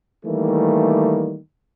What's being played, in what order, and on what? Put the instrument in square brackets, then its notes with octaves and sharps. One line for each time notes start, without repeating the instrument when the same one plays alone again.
[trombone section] D#3 E3 G3 A3 A#3